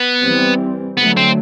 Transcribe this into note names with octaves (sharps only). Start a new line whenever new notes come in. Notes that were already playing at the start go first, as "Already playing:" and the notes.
Already playing: B3
E3 G3 C4
D3 F#3 A3 B3
C4